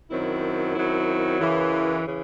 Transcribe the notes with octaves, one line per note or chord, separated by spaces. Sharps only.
F#2 D#3 F#3 C4 E4
F#2 D#3 F#3 C4 E4
F#2 C#3 E3
C#3 E3